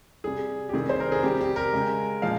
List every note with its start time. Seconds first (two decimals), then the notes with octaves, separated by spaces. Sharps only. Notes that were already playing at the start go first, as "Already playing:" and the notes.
0.24 C3 G3 G#4
0.69 G4
0.74 C3 D#3 G3 G#4
0.89 C5
1.00 A#4
1.12 G#4
1.23 C3 G3 G4
1.41 G4
1.56 A#4
1.73 C#3 G#3
2.22 A#2 F3 G#3 F5